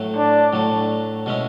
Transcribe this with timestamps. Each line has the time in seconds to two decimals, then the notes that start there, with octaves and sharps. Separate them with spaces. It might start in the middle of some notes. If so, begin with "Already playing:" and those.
Already playing: A2 F#3 A3
0.17 D4
0.53 A2 F#3 A3
1.26 B2 G#3 C#4 E4